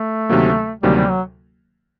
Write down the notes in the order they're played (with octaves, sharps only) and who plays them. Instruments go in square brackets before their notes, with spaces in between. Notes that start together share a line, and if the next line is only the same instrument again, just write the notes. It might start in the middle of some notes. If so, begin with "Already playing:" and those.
Already playing: [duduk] A3
[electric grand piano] D2 C3 D#3 F#3 A#3
[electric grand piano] D2 C3 D#3 F#3 A#3 [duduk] G3
[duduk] G3
F#3